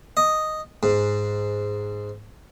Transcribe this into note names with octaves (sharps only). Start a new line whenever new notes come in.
D#5
G#2